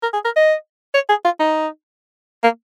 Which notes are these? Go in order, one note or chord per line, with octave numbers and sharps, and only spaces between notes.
A#4
G#4
A#4
D#5
C#5
G#4
F4
D#4
A#3